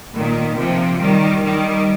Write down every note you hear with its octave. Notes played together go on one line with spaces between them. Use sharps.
A#2 D#3
C3 F3
D#3 G3
D#3 G3